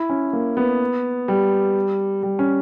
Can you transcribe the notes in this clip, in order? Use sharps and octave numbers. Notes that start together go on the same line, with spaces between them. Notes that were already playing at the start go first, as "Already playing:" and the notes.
Already playing: E4
C#4
A#3
B3
G3
G3
C#4